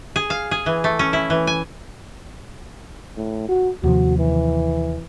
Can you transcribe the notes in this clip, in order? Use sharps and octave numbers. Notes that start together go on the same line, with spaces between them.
G#4
F5
G#4
E3
A3
C#4
E4
E3
G#5
A2
F#4
D#2 C3 F3 F#4
E3